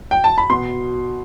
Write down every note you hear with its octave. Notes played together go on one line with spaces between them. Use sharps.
G5
A5
B5
B2 C6